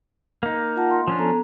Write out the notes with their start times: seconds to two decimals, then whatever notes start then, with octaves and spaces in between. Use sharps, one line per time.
0.43 A#3 D#4
0.76 F4 F#5 A5
0.91 C6
1.08 F3 C#4 D4
1.19 B3 A4 A#5